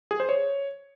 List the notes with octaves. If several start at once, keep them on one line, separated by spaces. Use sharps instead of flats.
G#4
C5
C#5